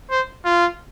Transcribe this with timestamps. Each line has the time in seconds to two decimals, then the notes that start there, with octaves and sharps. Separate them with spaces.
0.11 C5
0.45 F4